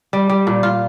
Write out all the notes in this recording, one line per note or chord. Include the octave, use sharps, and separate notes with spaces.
G3
G3
A#2
F4